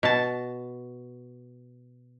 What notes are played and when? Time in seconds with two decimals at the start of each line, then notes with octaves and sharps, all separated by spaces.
0.03 B2 A5